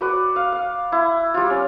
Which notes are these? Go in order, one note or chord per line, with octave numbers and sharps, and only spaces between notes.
F#4 B4 D5
F5
F5
E4
G3 F4
C#4